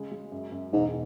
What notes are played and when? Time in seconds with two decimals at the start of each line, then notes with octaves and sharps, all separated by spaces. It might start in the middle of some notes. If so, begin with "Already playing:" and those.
Already playing: C#3 G#3
0.12 G#3
0.32 F#2
0.52 F#2
0.72 E1 G#2